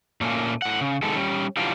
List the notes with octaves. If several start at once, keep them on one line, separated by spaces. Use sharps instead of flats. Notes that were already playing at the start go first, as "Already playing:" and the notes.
A#2 A3 A#3 C#4
A2 F#5
C#3
D#3 G#3 B3 A4
G3 C#4
E3 F#3 G3 D4 F4